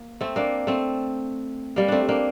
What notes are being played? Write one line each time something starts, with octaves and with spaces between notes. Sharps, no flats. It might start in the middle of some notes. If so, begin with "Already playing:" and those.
Already playing: A#3
A3 C4
A#3 D4
A3 C4
G3 A#3
A3 C4 D4
A#3 D4